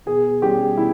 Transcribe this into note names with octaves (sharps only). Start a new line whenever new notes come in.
B2 G#4
G3 C#4 G4
B2 E4